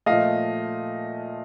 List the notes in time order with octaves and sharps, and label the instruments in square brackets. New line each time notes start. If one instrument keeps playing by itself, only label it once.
[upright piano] A#2 F3 A3 D#5 F5